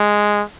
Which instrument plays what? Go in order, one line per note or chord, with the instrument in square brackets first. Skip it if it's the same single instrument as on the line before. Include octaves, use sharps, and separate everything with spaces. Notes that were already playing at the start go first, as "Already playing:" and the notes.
Already playing: [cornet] G#3